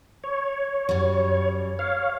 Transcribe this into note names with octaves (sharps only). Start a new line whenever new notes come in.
C#5
F#2 G3
C#5 F5